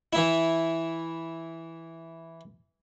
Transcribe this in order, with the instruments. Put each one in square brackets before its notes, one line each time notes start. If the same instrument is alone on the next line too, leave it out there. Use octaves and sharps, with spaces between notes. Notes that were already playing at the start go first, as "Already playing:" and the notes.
[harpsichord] E3 E4